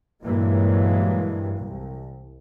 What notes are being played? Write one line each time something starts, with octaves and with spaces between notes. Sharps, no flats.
G2 A#2 E3 F#3 G#3 A#3
C2